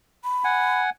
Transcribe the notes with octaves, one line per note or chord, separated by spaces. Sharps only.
B5
F#5 G#5